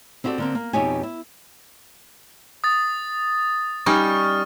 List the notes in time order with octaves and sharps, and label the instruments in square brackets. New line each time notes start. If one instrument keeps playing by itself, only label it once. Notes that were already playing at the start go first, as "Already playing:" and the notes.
[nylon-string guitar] C4 E4 F#4 G4 A4 D5
D3 A#3 C4
A#3
F2 B2 D#4 G4 C#5 G#5
E4
[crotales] D#6 A6
[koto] G3 C#4 D#4 [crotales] C#6 F6